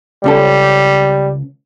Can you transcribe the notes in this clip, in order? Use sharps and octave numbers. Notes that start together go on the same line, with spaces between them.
C#2 G3 C#4 A4